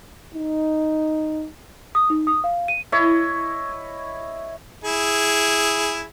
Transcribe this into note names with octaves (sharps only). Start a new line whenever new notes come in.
D#4
D#6
D#4
D#6
F5
D#7
E4 C#5 D#5
E4 G#4